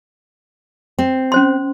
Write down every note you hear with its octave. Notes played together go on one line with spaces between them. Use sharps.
C4
C#4 C5 C6